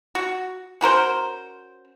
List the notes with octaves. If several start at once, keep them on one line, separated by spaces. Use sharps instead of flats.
F#4
C#4 F#4 A#4 C5